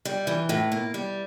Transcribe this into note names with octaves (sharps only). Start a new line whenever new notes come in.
G3
E3
A2
A#3
G3